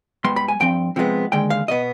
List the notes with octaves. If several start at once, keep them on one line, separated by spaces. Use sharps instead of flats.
G#2 G3 B3 C6
B5
G#5
G2 F3 C4 G5
C3 F3 G#3 B3
D#2 D3 G#3 G5
F5
B2 B3 D#5